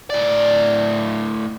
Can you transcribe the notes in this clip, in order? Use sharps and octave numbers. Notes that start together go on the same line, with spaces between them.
A2 D5